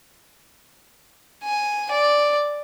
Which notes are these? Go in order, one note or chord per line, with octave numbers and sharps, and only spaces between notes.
G#5
D5